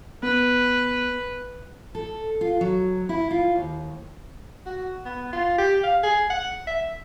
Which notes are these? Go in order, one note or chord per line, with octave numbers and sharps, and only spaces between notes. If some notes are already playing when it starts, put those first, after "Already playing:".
B3 B4
A4
F4
F#3
E4
F4
D#2
F#4
B3
F4
G4
F5
G#4
F#5
E5